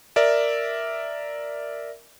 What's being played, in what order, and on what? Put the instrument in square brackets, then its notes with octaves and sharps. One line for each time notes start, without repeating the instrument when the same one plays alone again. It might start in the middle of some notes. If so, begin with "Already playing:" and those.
[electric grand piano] A#4 D5 E5